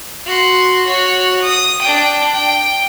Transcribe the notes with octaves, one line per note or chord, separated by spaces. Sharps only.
F#4 C6
F#4 C#5
D#6
D4 G5
G5